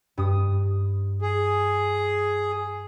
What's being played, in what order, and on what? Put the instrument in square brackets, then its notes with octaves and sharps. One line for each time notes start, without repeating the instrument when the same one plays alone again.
[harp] G2 D#6
[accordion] G#4